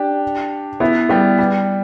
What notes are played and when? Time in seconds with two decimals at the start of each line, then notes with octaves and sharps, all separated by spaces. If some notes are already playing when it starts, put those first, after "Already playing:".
Already playing: D4 G4
0.80 B3 E4
1.09 G3 B3
1.39 G3